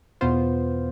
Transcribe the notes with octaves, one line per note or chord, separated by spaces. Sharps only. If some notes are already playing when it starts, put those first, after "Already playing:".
E2 B2 B3 F4 C5